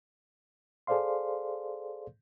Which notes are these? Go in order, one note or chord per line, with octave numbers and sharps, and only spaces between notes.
G#4 A4 C5 D5 F5 C6